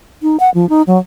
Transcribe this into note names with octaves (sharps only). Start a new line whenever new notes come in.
D#4
F#5
F3
D#4
F#3